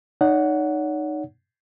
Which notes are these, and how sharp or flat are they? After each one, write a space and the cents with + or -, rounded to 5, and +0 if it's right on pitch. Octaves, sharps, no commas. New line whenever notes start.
D#4 -20 C#5 +40 F#5 +0